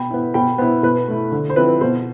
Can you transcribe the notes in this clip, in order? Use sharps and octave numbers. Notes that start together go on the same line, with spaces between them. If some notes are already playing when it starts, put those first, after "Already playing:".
Already playing: B2 G5 B5
B3 E4
B2 G5 B5
B3 E4 C5
B2 B4
A3 E4
D3
C5
F3 C4 E4 B4
B2 C5